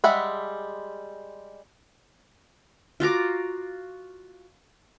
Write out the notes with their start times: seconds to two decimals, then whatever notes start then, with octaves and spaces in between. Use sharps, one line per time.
0.04 G3 G#3 E5 F#5 B5
3.00 F4 F#4 A#5 D6